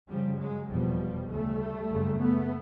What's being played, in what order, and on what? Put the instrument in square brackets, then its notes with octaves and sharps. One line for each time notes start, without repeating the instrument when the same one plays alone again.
[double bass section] G1 F#2 C#3 F3 G3
F#3 G#3
F1 E2 B2 F3 G3
D2 C#3 G3 A3
F#1 F#2 C#3
A3 B3